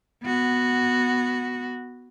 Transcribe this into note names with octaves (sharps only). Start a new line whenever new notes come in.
B3 F#4